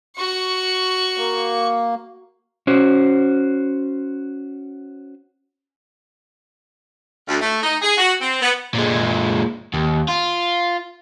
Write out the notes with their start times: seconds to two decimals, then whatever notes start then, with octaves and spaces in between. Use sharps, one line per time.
0.17 F#4 C#6
1.17 A#3
2.67 C#4 F#4 C5
7.28 D2
7.41 A3
7.62 D#4
7.82 G#4
7.98 F#4
8.20 C4
8.42 B3
8.75 A#2 G#3
9.74 D#2
10.09 F4